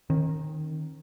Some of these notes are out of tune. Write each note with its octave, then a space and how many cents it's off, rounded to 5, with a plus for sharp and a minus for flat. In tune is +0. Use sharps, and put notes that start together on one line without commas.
D#3 -5 C#4 -45